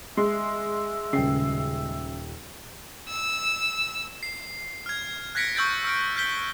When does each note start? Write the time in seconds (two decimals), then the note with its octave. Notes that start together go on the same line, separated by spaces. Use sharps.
0.17 G#3 E5 C6
1.13 D#1 C#3 G5 C7
3.08 E6
4.23 C7
4.86 F6 G#6
5.35 F#6 G#6 A#6 B6 C#7 D7
5.55 C#6 E6 G6 A6 D7
5.84 E6 F6 D7
6.16 F6 G6 B6 G7